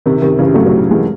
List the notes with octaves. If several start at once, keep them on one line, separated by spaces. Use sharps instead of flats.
C3 D#3
C3 D#3
C#3 E3
F#3 A3
F#3 A3
E3 G#3